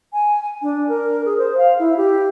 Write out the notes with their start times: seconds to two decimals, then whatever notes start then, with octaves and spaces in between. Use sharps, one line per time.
0.13 G#5
0.62 D4
0.88 A#4
1.25 G#4
1.38 C5
1.57 F5
1.79 E4
1.97 G4